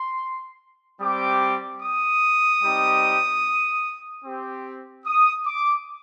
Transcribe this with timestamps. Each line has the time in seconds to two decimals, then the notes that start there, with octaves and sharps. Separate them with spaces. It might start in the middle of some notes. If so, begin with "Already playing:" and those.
Already playing: C6
1.01 G3 C4 G4 D6
1.82 D#6
2.63 G3 C4 D#4 G4
4.25 C4 G4
5.06 D#6
5.46 D6